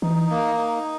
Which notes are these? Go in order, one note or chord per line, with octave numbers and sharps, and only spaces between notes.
E3 D#4
A#3
D#4